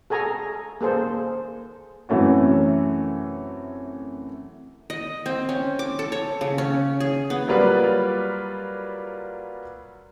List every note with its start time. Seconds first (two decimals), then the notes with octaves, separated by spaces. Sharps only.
0.10 G#4 A4 G#5 A#5
0.81 A#3 G#4 A4 C5
2.09 F#2 C3 E3 A3 C#4 F#4
4.90 D#5
5.26 C4
5.49 C#4
5.79 D6
5.99 A4
6.12 C#5
6.41 C#3
6.58 C#4
7.00 G#4
7.30 B3
7.48 F#3 G3 A#3 F4 B4 D5